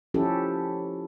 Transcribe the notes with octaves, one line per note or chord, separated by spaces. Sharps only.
F3 C#4 E4 G4 A4